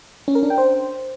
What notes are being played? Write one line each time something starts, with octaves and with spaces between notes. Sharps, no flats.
C#4
A#4
D4
G5
C5